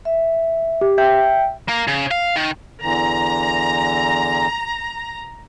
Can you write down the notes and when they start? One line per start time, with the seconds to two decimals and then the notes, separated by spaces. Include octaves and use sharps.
0.05 E5
0.81 G4
0.98 E5 G5 G6
1.68 A#3
1.87 C#3
2.11 F5
2.36 D#3
2.82 E2 D3 E3 A#5